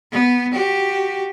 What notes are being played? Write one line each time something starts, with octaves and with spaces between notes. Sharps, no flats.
B3
F#4 G4